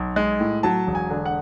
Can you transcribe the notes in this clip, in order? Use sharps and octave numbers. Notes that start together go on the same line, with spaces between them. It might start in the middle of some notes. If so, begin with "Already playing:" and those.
Already playing: B1
G#3
A2
F#3 A5
E1
G#5
D3
F#5